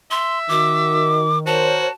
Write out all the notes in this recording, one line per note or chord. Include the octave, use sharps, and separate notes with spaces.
E5 C6
D#3 F#4 D6
F#4 A#4 C5 C#5 A5